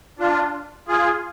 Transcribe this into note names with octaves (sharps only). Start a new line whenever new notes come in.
D4 F4
F4 G#4